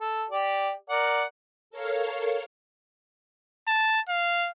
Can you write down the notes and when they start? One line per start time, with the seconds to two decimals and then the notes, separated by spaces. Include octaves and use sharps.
0.01 A4
0.30 G4 D5
0.90 A#4 D5 F#5
1.70 A4 A#4 C#5 F5
3.68 A5
4.08 F5